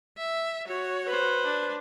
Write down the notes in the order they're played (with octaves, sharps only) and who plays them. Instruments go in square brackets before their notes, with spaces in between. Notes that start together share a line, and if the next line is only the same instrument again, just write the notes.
[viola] E5
F#4 C#5
[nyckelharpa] B4 C5
[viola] D4